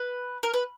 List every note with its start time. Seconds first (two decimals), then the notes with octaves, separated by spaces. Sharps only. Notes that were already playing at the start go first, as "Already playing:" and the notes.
Already playing: B4
0.43 A#4
0.54 B4